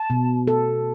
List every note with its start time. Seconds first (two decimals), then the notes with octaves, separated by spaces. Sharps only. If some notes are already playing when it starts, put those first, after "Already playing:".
Already playing: A5
0.10 B2
0.47 A4